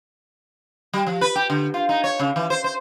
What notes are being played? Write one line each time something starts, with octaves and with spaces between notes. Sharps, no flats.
G3
F3
B4
G4
D3
F4
D#4
C#5
C#3
E3
C5
C5